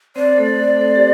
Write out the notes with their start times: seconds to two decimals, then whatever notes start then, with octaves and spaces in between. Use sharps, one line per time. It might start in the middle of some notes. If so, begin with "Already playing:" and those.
0.16 C4 C5 D5
0.38 A3 A4
0.60 A3 A4
0.78 A4
0.81 C4 C5
0.96 G4